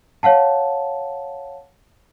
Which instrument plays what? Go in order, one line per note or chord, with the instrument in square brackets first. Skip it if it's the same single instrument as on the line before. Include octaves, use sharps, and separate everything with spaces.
[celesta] C#5 F5 F#5 A5